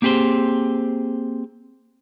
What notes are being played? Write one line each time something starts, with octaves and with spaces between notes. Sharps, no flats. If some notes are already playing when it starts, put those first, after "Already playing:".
A#3 C4 G4 G#4 C5